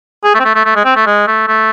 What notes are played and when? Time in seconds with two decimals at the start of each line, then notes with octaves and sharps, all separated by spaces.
0.24 G#4
0.34 A3
0.40 C4
0.45 A3
0.55 A3
0.65 A3
0.76 G#3
0.85 C4
0.96 A3
1.06 G#3
1.27 A3
1.47 A3